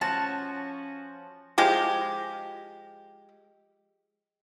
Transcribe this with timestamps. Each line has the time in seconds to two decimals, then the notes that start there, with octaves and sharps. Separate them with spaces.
0.01 F3 C#4 F#4 A5
1.58 F3 G#3 G4